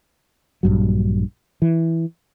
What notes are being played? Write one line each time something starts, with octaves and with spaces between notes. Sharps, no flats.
A#1 G2 F#3
E3